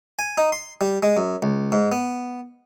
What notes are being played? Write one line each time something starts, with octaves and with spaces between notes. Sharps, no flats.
G#5
D#4
C6
G3
G#3
F#2
C#2
G#2
B3